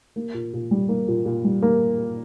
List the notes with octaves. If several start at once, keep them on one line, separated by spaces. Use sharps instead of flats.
A#3
A#2
A#2
G3
A#3
A#2
A#2
G3
A#3